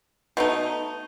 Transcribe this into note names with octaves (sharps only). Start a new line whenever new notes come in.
B2 A3 D#4